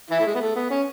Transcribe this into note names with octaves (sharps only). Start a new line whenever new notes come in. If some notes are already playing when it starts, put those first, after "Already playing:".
E3 E4
A3
G#3
B3
A3
B3
C#4